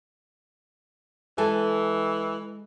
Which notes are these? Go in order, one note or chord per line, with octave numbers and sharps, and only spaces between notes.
E3 G#3 A4 G#5